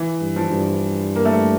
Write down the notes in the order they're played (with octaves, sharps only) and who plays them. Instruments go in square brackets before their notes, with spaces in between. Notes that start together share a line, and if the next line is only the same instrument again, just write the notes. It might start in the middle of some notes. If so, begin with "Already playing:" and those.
Already playing: [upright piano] E3
[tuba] G2
[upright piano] F3
[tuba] G2
[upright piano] A#3
A3